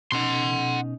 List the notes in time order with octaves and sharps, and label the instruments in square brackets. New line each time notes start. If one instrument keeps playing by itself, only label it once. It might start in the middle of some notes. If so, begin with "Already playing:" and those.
[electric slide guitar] B2 C#4 D#4 [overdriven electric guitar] F#5 C6